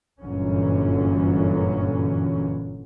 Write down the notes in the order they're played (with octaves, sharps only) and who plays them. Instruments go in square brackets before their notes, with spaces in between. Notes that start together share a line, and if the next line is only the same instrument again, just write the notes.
[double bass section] G1 F#2 A#2 D3 E3 C#4